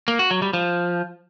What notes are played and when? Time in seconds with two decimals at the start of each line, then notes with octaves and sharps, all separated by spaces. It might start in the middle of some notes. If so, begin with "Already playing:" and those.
0.08 A#3
0.19 F#4
0.31 F#3
0.42 G3
0.54 F3